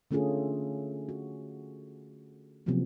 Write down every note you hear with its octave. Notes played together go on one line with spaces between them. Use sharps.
D3 A3 C#4 F4 G#4 A4
F#4
C3 F3 F#3 A#3 B3